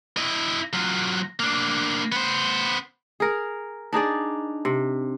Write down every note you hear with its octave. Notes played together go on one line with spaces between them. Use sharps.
E4 D#5
F#3 F4
A#3 D4
B3 C5
G#4 A#4
D4 D#4 G#4 D5
C3